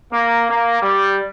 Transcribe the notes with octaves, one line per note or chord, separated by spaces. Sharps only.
A#3
A#3
G3